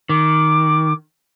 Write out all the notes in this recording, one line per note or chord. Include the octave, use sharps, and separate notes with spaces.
D#3 D6